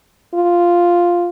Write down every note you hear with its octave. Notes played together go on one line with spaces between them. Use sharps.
F4